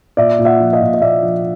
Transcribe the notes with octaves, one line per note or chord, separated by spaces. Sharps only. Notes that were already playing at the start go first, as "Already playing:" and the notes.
A#2 D5 E5
A#2
E5 F#5
F3
D#5 F5
A#2
D#5
A#2 D5 E5
F3